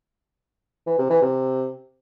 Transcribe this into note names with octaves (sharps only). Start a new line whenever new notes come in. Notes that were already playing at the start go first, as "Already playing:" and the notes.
E3
C3
E3
C3